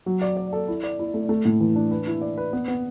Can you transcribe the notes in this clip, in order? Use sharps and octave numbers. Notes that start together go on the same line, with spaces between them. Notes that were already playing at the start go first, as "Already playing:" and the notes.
F#3
D5
D5
A4
E4
D5
E4
A3
A3
A2
E3
D4
B4
E4
D5
B4
B3
B3